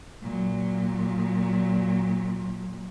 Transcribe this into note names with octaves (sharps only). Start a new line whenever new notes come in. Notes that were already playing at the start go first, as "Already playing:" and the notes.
A#2 F#3